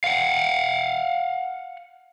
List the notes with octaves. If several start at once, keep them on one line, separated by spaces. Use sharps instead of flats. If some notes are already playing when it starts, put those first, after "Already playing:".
F5 F#5